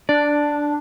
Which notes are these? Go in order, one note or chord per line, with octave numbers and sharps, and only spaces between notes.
D4 D5